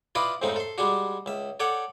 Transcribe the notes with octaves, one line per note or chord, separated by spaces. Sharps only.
E4 F4 B4 D5 D#5 B5
F2 G#2 C#3 A3 C4 D#4
A4 C6
G3 G#3 D4 F#4
C#2 E5
A4 C#5 D5 F#5 G5